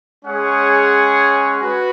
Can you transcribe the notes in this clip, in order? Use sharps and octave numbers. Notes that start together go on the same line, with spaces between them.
G#3 C#4 G#4 C#5 F#5
F#4 B4